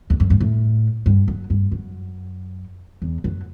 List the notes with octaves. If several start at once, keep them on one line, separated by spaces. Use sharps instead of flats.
E2
F#2
G2
A2
G2
F#2
G2
F#2
E2
F#2